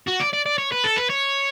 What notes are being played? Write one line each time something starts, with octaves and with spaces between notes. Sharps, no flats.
F#4
D5
D5
D5
C#5
B4
A4
B4
C#5